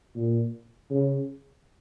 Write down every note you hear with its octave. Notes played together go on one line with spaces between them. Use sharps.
A#2
C#3